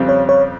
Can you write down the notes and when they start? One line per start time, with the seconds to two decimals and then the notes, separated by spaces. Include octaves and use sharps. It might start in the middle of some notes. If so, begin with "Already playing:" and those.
Already playing: F2 C#3 G3 C4
0.09 C#5
0.29 C#5